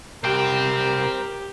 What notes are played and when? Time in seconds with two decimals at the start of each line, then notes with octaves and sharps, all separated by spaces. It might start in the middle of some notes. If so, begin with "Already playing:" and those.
0.24 C2 G4 A#4 C5 G5